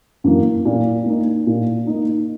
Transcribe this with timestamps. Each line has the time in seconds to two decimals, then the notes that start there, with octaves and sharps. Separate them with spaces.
0.24 F#2 E3 A#3
0.65 A#2
1.06 A#3 D#4
1.47 A#2
1.87 A#3 D#4